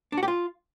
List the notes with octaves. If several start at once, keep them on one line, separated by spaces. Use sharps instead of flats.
D4
F#4
G4
F4